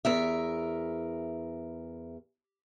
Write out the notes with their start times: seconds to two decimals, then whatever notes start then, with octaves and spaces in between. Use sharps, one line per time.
0.05 E2 A#4 E5